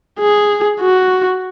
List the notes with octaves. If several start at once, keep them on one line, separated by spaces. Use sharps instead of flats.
G#4
F#4